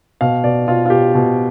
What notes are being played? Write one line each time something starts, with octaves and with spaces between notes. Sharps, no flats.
B2 F5
B2 D5
B2 F4
F4
B2 G4
B2